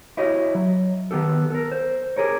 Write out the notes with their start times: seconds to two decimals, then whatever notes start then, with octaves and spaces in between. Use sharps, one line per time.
0.17 E4 F#4 G4 C#5 D#5
0.55 F#3
1.11 D#3 B3 G4 A4
1.50 A4 A#4
1.71 C5
2.16 G4 G#4 A#4 C#5